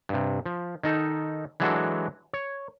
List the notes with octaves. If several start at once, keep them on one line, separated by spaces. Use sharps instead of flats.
G2 C3
F3
D#3 D#4 A4
E3 F#3 G#3 D4 F#4 A4
C#5